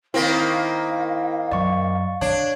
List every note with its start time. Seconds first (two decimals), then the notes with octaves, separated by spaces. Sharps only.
0.14 D#3 A#3 C4 E4 F5 A#6 B6
1.51 F#2 D5 C#6
2.21 D3 D4 C#5